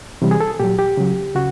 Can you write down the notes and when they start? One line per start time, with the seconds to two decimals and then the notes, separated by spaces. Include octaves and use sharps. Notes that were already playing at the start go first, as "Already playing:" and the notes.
0.22 C3 E3 G3
0.31 G#4
0.41 A4
0.60 A#2 F#3 G4
0.79 G4
0.97 C#3 F#3
1.35 C#3 F#4